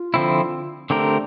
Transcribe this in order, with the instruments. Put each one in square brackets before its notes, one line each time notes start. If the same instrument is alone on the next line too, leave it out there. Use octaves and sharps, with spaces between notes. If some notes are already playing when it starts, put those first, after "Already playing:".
Already playing: [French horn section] F4
[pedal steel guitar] D3 F3 C4 E4
[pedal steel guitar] D3 A3 C4 G4 A#4 [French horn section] D4